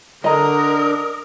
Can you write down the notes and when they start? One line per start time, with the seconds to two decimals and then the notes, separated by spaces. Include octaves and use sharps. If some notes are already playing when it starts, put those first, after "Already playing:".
0.24 D3 A#4 D#5 A#5 D#6